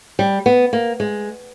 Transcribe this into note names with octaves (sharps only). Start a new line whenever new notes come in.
G3
B3
A#3
G#3